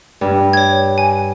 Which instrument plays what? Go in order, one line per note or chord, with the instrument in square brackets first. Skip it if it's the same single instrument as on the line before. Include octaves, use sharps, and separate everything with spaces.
[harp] G2
[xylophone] C#5 G#6
G#5